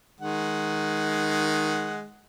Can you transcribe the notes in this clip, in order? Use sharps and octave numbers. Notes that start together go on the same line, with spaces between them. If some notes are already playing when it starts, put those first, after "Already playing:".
D#3 G#3 F#5